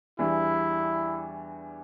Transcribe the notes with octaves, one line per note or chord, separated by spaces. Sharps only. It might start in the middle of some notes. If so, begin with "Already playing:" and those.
E2 E3 G3 D4 E4